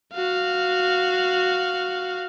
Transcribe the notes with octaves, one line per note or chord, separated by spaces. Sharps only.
F#4 F5